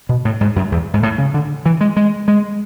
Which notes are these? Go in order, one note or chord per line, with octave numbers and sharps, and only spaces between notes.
B2
A2
G#2
F#2
E2
G#2
A2
C#3
D3
E3
G#3
G#3
G#3